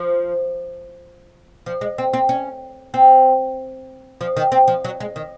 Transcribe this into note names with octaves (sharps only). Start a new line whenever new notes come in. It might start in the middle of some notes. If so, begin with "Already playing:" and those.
Already playing: F3
F3
G#3
C4
C4
C#4
C4
F3
D#3
C4
F3
F#3
G#3
D#3